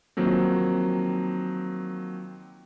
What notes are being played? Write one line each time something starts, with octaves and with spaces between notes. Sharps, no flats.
D#3 F3 F#3 A#3 C4